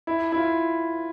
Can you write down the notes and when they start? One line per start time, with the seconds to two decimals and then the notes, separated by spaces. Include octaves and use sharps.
0.07 E4
0.32 E4
0.37 F4